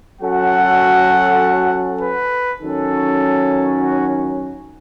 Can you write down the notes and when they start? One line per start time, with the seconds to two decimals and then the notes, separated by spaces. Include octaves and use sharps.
0.21 F#3 C#4 F#4 A4 F#5
2.01 B4
2.62 D#3 F#3 C#4 A4
3.81 F#4